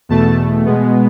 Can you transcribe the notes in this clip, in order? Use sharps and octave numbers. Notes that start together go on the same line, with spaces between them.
E2 B2 A3 A5
B2 G#3 B3